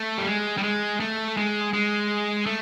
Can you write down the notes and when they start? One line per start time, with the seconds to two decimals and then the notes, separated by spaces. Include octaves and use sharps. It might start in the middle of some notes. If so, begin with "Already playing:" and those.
Already playing: A3
0.18 G3
0.27 G#3
0.57 G3
0.63 G#3
1.00 A3
1.37 G#3
1.73 G#3
2.46 A3